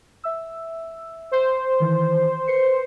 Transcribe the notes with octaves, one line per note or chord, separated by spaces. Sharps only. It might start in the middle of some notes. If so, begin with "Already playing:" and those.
E5 E6
C5
D#3 E3
B4 C7 C#7